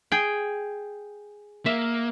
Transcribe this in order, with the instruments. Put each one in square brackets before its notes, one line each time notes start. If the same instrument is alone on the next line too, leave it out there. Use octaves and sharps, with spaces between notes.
[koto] G#4 G5
[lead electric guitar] A#3 [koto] E5